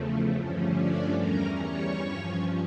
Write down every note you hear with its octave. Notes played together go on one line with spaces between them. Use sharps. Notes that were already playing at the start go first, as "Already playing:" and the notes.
Already playing: E2 C#3 F3 A3
G2 D3 F3 A3 C#4
D4 D5
E2 E3 G3 C#4 A#4 A#5
C#5 C#6
G2 F3 C#4